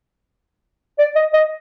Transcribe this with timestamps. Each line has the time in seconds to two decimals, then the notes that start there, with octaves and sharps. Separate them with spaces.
0.99 D5
1.16 D#5
1.34 D#5